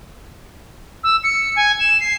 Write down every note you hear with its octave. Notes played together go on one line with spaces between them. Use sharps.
E6
C#7
G#5
E7
C7